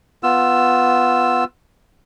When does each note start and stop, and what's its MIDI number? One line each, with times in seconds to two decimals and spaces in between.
0.23 1.44 59
0.23 1.44 65
0.23 1.44 88